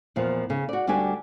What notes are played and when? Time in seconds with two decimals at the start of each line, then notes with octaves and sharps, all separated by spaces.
0.16 E2 A#2 F3
0.50 C#3
0.69 F#4 D5
0.87 D2 G3 D4 F#4 G4 G#5